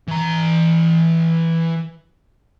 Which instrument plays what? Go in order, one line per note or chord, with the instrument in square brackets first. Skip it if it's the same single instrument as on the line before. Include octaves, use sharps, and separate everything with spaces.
[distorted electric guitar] E3 A#5